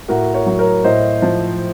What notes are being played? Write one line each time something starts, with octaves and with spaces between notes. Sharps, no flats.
A2 F#4 A#4
A#4 C#5
F#3
A#4 C#5
A2 C5 D#5
F3